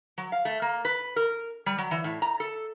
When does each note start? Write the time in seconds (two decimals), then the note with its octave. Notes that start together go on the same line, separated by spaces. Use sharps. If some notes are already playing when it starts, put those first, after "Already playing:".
0.18 F#3
0.32 F5
0.45 A3
0.62 A#3
0.85 B4
1.16 A#4
1.66 G3
1.78 F#3
1.91 E3
2.04 A2
2.22 A#5
2.40 A4